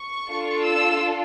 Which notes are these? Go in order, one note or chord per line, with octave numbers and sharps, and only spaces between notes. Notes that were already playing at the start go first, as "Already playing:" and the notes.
Already playing: C#6
D4 F4 A4
E6